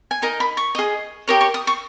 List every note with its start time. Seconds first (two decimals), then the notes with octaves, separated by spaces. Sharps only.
0.11 G#5
0.22 D#4 A#4 D#5 A#5
0.40 B5
0.57 C#6
0.75 G#4 D#5
1.28 G4 A#4 C#5 D#6
1.41 C#6
1.54 D#6
1.67 C#6